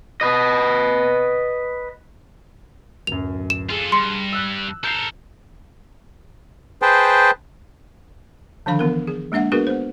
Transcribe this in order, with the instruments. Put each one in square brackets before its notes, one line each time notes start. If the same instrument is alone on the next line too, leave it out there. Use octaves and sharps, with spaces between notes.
[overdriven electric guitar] B4 D#5
[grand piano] D1 F#2 [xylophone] F7
[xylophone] E7
[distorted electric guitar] F4 A4 [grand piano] G#4
[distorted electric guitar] G2 [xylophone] C6 C#7
[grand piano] E6 F#6
[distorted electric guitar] A4 A#4 [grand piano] G6 C7
[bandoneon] G#4 B4 C5 G5 A5
[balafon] D3 D#3 F3 D4 F5 B5
E3 B3 A#4
G#4
G#3 A#3 D4 E5 F#5
B3 D4 F#4 G#4 A#4 B4
B3 C5